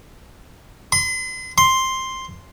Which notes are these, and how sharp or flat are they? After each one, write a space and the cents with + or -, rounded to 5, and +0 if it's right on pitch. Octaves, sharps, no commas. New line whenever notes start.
C6 -40
C6 +5